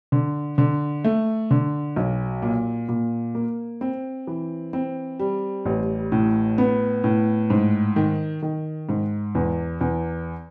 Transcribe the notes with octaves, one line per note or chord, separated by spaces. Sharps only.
D3
D3
A3
D3
B1
A#2
A#2
A#3
C4
E3
C4
G3
A1
A2
B3
A2
G#2
D#3
D#3
G#2
E2
E2